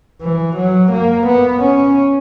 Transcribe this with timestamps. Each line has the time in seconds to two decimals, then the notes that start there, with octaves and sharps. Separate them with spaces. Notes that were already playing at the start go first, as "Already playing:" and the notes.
0.22 E3
0.57 F#3
0.92 A#3
1.27 B3
1.63 C#4